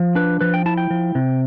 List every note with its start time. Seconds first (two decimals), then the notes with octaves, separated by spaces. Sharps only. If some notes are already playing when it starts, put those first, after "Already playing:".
Already playing: F3
0.15 D4 B4
0.41 F3 B4
0.54 G5
0.66 E4 A5
0.77 G5
0.90 F3
1.15 C3